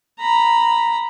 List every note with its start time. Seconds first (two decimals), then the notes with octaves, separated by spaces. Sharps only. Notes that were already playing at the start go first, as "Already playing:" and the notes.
0.20 A#5 B5